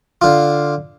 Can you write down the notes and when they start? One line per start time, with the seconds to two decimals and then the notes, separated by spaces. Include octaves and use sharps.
0.22 D3 F4